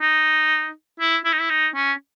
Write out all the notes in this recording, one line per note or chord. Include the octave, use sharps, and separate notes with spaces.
D#4
E4
E4
D#4
E4
D#4
C#4